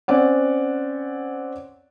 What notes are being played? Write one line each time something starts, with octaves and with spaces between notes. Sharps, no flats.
C4 C#4 D5 F#5